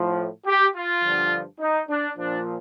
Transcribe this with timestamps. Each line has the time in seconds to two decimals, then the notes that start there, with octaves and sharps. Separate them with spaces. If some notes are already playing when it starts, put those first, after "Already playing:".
Already playing: A2 F3
0.46 G4
0.75 F4
1.03 G2 D3 F3
1.60 D#4
1.89 D4
2.17 A#2 F3 D4